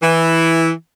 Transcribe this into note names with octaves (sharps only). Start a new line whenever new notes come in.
E3